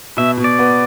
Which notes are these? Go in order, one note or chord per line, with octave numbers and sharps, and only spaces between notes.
B2 E5
B2
D5
B3